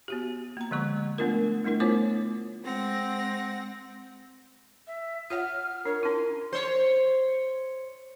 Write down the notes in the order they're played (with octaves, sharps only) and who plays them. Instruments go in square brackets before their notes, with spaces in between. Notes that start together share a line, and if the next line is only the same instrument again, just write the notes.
[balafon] B3 F#4 G4
A#3 A#5
D3 F3 G#3 C#6
A3 B3 D4 F4 A#4
G3 A3 D4 E4 A#4
A3 B3 F4 C5 C#5 D6
[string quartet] G#3 C4 F#5 A#6
[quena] E5
[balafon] F4 C#5 F#5 [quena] F6
[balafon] D4 [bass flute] A#4 [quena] C#5
[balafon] C#4 E4 [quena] C6
[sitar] C5 C#5